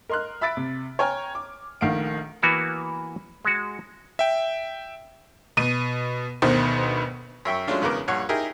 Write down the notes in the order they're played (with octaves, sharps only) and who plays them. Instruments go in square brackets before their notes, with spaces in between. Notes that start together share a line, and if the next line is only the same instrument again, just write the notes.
[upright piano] A#4 D#5 C6 F6 F#6
E5 B5 E6 A6 B6 D7
C3
C#5 G5 G#5 A#5 F6
D6
A#1 D#3 A3 F5 F#5 D7
[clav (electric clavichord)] E3 A#3 B3 F#4 A#4
G#3 F#4
[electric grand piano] E5 G5
[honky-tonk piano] B2 D#7
D2 B2 D#3 B3 C5
[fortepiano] F#2 E5 G5 C#6
F#3 G#3 A3 C#4 D4 F4
E2 C#3 B3 A#4 D6
A#1 G2 C#5 F#5 F#6
D#4 E4 G4 G#4 A#4